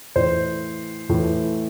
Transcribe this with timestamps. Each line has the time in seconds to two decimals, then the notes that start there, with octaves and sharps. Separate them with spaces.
0.16 A2 E3 C5
1.09 A2 E3